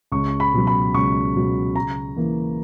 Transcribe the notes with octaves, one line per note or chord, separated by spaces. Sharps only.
C#2 C#6
B5
B2 F#3
B5
C#2 C#6
B2 F#3
C#3 A#5
E3 A#3 E4